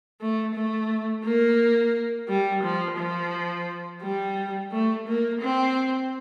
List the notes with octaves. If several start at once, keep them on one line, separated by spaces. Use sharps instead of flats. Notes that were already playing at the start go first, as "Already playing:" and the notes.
A3
A3
A#3
G3
F3
F3
G3
A3
A#3
C4